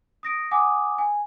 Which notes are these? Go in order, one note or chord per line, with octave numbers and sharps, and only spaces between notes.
D#6 A#6 D7
F#5 G#5 D6 D#6
G#5